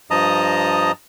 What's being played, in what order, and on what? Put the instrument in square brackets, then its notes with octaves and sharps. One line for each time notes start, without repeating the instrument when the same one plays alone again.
[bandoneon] G2 F3 D#5 A5 A#5 D#6